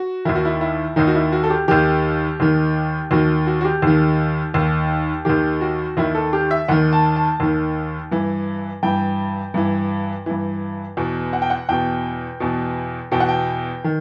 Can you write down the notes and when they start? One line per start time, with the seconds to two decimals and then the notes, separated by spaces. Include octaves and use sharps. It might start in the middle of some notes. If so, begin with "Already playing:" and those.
Already playing: F#4
0.25 D#2 D#3 E4
0.35 F#4
0.45 E4
0.61 E4
0.96 D#2 D#3 D#4
1.07 F#4
1.15 E4
1.32 F#4
1.43 A4
1.50 G4
1.68 D#2 D#3 G4
2.40 D#2 D#3
3.11 D#2 D#3 F#4
3.47 F#4
3.61 F#4
3.65 G4
3.82 D#2 D#3
4.54 D#2 D#3
5.25 D#2 D#3 G4
5.61 F#4
5.97 D#2 D#3 E4
6.15 A4
6.33 G4
6.51 E5
6.68 D#2 D#3 F#5
6.93 A5
7.16 A5
7.40 D#2 D#3
8.12 G2 E3
8.83 G2 E3 G5
9.54 G2 E3
10.26 G2 E3
10.97 E2 B2
11.33 F#5
11.42 G5
11.50 F#5
11.69 E2 B2 G5
12.40 E2 B2
13.12 E2 B2 G5
13.20 F#5
13.29 G5
13.84 D#3